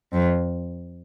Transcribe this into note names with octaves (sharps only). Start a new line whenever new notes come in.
F2